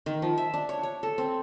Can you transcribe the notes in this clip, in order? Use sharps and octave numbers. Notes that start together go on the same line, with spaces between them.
D#3
F3
E5
D4
C#5
C#5
A4
C4